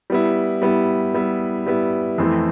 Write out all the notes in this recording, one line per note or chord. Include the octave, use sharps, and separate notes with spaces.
G3 B3 E4
G3 B3 E4
G3 B3 E4
G3 B3 E4
F2 E3 A3 C4 E4